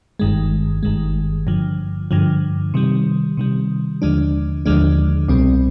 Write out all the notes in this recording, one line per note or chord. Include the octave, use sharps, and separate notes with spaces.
G1 G2 D#3 G#3
G1 G2 D#3 G#3
G2 D3 F3
G2 D3 F3
C3 D#3 G3
C3 D#3 G3
D#2 D3 F3 G#3 D4
D#2 D3 F3 G#3 D4
C2 B2 G3 C4